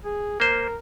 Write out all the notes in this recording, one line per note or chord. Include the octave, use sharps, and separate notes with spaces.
G#4
A#3 A#4 C5